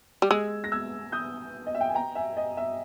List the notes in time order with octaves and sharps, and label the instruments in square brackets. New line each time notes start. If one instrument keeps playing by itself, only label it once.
[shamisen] G3
[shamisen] G#3 [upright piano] E6 G#6
[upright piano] A#6
E6 G#6
D#6 G6
D#5
E5
G5
G#5
G5 A#5
E5 G#5
D#5
E5